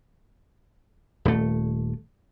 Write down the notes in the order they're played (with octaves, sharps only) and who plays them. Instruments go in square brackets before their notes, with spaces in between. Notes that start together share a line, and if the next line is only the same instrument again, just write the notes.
[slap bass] D#1 A3